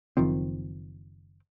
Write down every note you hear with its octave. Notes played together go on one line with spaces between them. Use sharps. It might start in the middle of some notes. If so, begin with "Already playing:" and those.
F#1 D#3 F3 C4